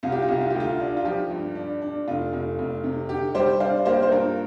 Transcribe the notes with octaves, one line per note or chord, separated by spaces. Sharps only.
C2 F4
G4
F4
C2 G4
F4
D2 G4
F4
D4
F4
F3 G4
G2
D4
D4
F1 F4
F1
F1
C3
D3 G4
G3 G4 C5
D4 C5 F5
A#3 G4 C5
C5
G2 F4 A#4